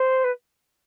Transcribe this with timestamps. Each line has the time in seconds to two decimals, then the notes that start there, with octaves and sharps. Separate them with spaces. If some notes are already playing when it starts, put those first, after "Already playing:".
Already playing: C5
0.24 B4